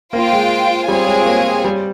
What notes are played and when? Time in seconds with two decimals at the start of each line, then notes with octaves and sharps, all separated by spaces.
0.13 A#3 F4 C5 G5
0.33 G#3
0.88 G3 C4 F4 G#4 C#5 G#5
1.07 G#3
1.26 A#3
1.64 G3